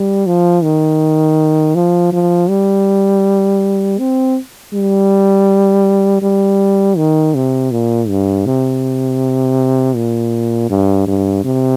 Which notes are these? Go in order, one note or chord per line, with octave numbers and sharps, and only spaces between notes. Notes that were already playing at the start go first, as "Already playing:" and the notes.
Already playing: G3
F3
D#3
F3
F3
G3
C4
G3
G3
D#3
C3
A#2
G2
C3
A#2
G2
G2
C3